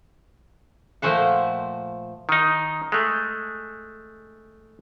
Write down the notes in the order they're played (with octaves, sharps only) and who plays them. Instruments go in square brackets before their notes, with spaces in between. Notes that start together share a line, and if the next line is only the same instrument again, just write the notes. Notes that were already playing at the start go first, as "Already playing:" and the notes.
[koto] A#2 F3 A3 C5 F#5
[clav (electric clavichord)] D#3 D#4
G#3 A3